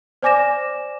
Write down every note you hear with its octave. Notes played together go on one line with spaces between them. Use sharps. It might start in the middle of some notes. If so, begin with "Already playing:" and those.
C5 D5 G#5 D6 A#6 E7